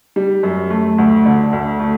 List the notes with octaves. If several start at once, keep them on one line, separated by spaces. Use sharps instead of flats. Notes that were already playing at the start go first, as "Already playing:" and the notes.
G3
F#2
A3
D2
D3
D2
A3